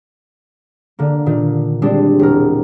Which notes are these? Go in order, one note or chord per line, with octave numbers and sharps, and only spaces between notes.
D3 A#3
A#2 D#3
G3 G#3 C4 D4
E1 A#4